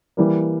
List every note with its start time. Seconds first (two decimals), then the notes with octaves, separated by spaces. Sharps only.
0.17 E3 G3 A#3